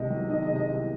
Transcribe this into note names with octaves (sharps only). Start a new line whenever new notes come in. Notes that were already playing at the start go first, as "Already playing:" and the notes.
Already playing: C2 C3 D#3 D#5
F#3
D#3 D#5
D#5
C3
D#5
C2